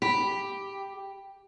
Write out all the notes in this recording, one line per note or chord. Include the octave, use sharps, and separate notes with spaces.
G4 B5